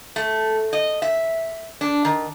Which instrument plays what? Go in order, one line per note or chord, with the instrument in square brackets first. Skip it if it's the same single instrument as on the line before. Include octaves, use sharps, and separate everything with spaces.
[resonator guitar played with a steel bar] A3
D#5
E5
D4
D#3